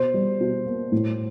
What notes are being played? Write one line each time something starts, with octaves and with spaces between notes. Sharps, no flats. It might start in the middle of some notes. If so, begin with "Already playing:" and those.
Already playing: B2 C5
G3
B2
A#3
A2